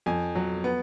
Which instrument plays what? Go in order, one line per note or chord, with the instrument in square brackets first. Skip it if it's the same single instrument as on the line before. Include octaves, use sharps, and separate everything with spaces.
[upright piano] F2 G#5
F#3
B3